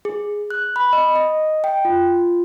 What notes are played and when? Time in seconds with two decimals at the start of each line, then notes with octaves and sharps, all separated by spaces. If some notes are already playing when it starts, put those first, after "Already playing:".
0.05 G#4
0.50 F#6
0.76 B5
0.93 D#5
1.16 D#5
1.64 G5
1.85 F4